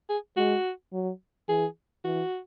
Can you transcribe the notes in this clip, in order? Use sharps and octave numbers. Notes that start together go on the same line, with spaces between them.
G#4
G#3 F#4
F#3
E3 G#4
E3 F#4